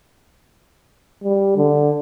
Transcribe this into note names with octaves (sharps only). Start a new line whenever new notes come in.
G3
D3